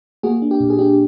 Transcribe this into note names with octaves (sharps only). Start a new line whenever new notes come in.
A#3 F#4 G#4
D4
G4
A#2
G#4
D4 G4